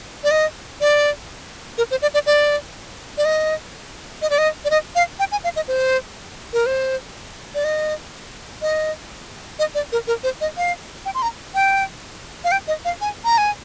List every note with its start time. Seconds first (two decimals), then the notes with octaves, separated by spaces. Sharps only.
0.24 D5
0.31 D#5
0.81 D5
1.78 A#4
1.91 C5
2.02 D5
2.14 D5
2.26 D5
3.18 D5
3.25 D#5
4.22 D#5
4.30 D5
4.38 D#5
4.65 D5
4.70 D#5
4.95 F5
5.19 G5
5.32 G#5
5.44 F5
5.56 D#5
5.68 C5
6.53 A#4
6.66 C5
7.55 D5
7.64 D#5
8.62 D#5
9.59 D#5
9.75 D5
9.92 A#4
10.07 A#4
10.24 C5
10.41 D#5
10.57 F5
11.05 G5
11.14 C6
11.22 A#5
11.54 G5
12.44 F5
12.52 G5
12.68 D#5
12.85 F5
13.01 G#5
13.25 A#5
13.38 G#5